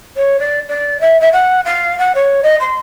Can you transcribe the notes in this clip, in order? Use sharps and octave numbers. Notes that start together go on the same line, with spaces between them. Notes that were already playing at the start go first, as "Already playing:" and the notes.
C#5
D5
D5
E5
E5
F#5
F5
F#5
C#5
D#5
C6